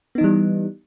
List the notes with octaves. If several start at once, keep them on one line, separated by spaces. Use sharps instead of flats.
E3 G3 B3 D#4